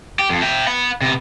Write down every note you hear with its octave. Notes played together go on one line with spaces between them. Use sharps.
G4
F2
E5 G5
F#5 B5
C3 B3